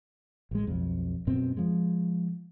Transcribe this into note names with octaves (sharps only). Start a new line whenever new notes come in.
A1 G#3
B1 F2
F#2 B2 C4
F3 G#3